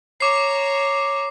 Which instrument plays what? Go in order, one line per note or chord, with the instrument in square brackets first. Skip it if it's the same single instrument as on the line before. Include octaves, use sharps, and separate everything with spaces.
[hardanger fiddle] C#5 A#5 [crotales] D6 C7